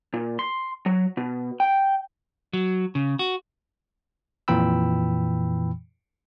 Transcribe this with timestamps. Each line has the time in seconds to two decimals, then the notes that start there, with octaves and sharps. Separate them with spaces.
0.14 A#2
0.39 C6
0.86 F#3
1.17 B2
1.60 G5
2.53 F#3
2.95 C#3
3.19 F#4
4.48 F2 A#2 E3 G5 B5 E6